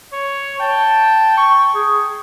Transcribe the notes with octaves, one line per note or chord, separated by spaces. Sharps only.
C#5
G5 A5
C#6
G#4